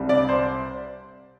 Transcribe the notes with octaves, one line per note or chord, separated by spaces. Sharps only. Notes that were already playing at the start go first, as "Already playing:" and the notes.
Already playing: C2 C3 G3
D5
C5